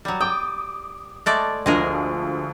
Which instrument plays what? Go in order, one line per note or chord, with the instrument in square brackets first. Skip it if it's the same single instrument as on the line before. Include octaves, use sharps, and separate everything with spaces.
[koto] F#3 G3
[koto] G5 [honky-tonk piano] D6 D#6
[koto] G#3 A3 D5
[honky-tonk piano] D2 D3 F3 [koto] G#3 G#4 A#4